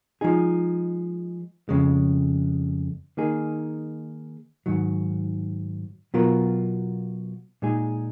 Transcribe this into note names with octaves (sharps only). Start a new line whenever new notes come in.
F3 G#3 D#4 G#4
F2 C#3 G#3
D#3 A#3 D#4 G#4
G#2 D#3 F#3
B2 F#3 B3 F4 A#4
A#2 G#3 D#4 G#4